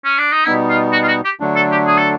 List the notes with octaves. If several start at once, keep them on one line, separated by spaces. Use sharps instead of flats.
C#4
D4
D#4
B2 G3 B3 D#4 E4
F4
F#4
F4
F#4
G4
D3 F#3 A3 D4
A4
G4
G#4
A4